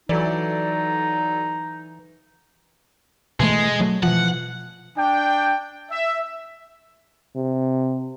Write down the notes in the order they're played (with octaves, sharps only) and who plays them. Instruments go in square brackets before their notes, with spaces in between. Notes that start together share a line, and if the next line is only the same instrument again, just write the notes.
[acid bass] E3 [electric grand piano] F#3 A4 D5 [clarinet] D#4
[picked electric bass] B2 E3 A3 [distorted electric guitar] G#3
[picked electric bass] F#3 A3
[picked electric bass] B2 E3 F3 [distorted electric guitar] F#5
[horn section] D4 G5
E5
[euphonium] C3